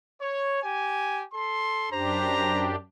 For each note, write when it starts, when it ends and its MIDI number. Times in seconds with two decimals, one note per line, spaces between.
0.20 0.59 73
0.62 1.23 67
0.62 1.23 80
1.33 1.87 69
1.33 1.87 84
1.91 2.76 42
1.91 2.76 62
1.91 2.76 67
1.91 2.68 72
1.91 2.68 82